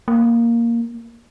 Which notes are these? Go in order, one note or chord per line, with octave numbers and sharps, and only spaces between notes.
A#3